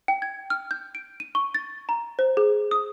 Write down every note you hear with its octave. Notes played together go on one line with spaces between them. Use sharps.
G5
G#6
F6
G6
D7
D#7
C#6
A6
A#5
C5
G#4
D#6